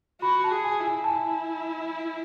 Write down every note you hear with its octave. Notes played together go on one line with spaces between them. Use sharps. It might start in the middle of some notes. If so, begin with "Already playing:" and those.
F#4 B5
A5
G#4
G#5
E4
G#5
A5
G#5